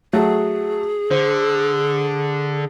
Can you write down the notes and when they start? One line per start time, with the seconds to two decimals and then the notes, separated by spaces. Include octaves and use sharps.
0.13 F#3 A3 F#4 G#4
1.11 D3 C5